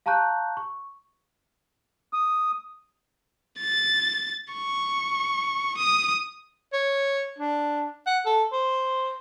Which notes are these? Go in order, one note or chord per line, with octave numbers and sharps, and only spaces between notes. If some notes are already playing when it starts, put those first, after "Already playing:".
F5 A5 A#5 C#6 F#6 G6
C#6
D#6
A6
C#6
D#6
C#5
D4
F#5
A4
C5